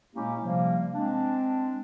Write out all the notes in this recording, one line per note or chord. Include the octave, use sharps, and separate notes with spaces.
A#2 G#3 A#3 C#4 E4 G4
C3 F3 G3 A#3
G#3 C4 D4